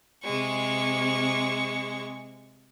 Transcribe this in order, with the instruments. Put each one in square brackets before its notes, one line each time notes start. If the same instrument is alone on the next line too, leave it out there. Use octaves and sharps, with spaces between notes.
[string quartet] C3 G#3 C#6